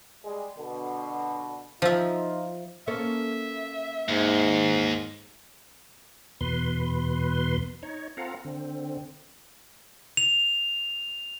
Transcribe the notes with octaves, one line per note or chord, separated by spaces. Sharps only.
G3 G#3 G#4
B2 D3
F3 D#4 F4 E5
A#3 C#4 A4 E5
D#2 G#2
E2 B2 B4 C6
D#4 C#5
C4 F4 A4 F5 F#5 A#5
D3 C4
F7